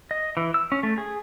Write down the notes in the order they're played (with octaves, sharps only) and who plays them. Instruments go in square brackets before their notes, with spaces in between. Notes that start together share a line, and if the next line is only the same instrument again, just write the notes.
[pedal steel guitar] D#5
E3
E6
C#4
A3
G#4